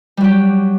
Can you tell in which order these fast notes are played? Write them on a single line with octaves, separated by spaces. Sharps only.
G3 F#3 G4